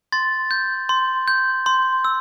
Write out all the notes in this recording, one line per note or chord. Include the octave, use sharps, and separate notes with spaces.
C6 A6
G6
C6
G6
C6
E6